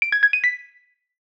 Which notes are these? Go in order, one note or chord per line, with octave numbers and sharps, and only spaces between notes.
D7
G#6
G#6
D#7
B6